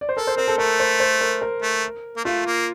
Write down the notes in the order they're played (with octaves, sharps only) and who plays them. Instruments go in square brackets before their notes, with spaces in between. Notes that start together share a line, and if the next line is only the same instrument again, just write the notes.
[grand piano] D5
C5
[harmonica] A4 [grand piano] A#4
[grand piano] C5
[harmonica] C4 [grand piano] A#4
[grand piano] A4
[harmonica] A3 [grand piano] A#4
[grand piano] C5
C5
A#4
A#4
[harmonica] A3
A#3
[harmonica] A3 [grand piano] F4
[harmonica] A#3